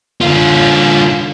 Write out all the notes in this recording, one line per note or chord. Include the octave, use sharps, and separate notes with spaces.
D3 F4